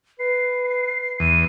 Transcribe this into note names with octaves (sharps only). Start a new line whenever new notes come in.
B4 C7
E2 D#7